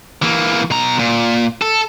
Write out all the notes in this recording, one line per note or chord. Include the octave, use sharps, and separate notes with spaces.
E3 A#3
B2 A#5
A#2
A4